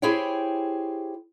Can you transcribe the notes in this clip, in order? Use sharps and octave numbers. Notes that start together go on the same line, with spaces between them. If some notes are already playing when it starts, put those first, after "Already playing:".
E4 G4 G#4 C5 C#5 G5